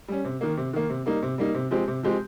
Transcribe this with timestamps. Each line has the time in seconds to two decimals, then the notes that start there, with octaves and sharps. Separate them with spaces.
0.08 G3 C#4
0.24 C3
0.41 D#3 A#3
0.57 C3
0.73 D#3 A#3
0.90 C3
1.06 G3 A#3 D#4
1.22 C3
1.38 G3 A#3 D#4
1.54 C3
1.71 F3 G#3 C4 G4
1.88 C3
2.03 F3 G#3 C4 G4